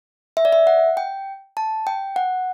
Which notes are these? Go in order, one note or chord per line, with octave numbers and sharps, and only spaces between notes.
E5
D5
E5
F#5
G5
A5
G5
F#5